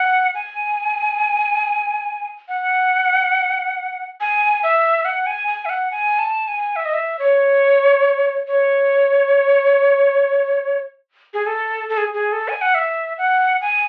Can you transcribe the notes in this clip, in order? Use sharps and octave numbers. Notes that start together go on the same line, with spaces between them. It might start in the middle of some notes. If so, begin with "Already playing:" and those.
Already playing: F#5
G#5
F#5
G#5
E5
F#5
G#5
G#5
E5
F#5
G#5
A5
G#5
E5
D#5
E5
C#5
C#5
G#4
A4
A4
G#4
G#4
A4
G#5
F#5
E5
F#5
G#5